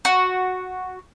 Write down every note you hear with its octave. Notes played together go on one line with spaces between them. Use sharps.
F#4